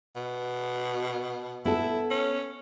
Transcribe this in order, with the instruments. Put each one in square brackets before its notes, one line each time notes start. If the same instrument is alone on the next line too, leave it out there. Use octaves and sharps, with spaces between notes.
[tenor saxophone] B2
[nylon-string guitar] B3 A4 [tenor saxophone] E4
[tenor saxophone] C#4